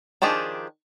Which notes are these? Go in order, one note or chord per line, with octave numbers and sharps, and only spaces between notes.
D#3 F3 D4 G4 G#4